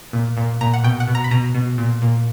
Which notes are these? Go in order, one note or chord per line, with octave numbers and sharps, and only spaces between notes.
A#2
A#2
A#2 A#5
F#5
B2 G5
F#5
B2
A#5
B5
B2 A#5
B2
A#2
A#2